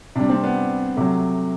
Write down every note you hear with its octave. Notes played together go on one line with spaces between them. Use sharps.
C3 G3 D4
C4
B3
C3 F#3 A3